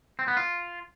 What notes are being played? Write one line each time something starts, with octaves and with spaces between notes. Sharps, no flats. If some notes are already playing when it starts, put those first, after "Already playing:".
C4
B3
F4